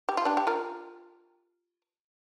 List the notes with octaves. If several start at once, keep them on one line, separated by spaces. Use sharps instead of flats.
G4
F4
D4 G4
G4
F4 A#4